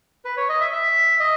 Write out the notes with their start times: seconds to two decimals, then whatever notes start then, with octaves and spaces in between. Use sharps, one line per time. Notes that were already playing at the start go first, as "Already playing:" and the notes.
0.25 B4
0.37 C#5
0.49 D#5
0.60 E5
0.73 E5
1.20 D#5